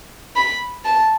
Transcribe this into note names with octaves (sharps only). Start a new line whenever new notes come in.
B5
A5